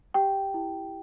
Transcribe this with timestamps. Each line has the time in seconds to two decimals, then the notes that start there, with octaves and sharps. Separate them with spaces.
0.14 G4 G5
0.54 E4